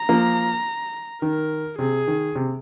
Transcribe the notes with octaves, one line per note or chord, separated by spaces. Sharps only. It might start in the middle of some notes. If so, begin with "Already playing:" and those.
Already playing: A#5
F3 A#3
D#3 A#4
C3 G#4
D#3
C3